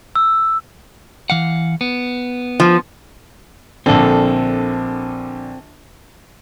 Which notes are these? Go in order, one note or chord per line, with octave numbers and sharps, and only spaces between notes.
E6
E3 F5 F#5
B3
F3
A#1 D3 C4 A4